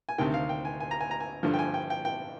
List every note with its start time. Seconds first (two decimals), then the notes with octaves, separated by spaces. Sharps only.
0.09 G#5
0.18 D2 C3 D#3 G5
0.34 F5
0.49 G5
0.65 G#5
0.80 G#5
0.91 A#5
1.01 G#5
1.11 A#5
1.20 G#5
1.43 G2 D3 F3
1.54 G5
1.59 G#5
1.74 G5
1.90 G5
2.05 G5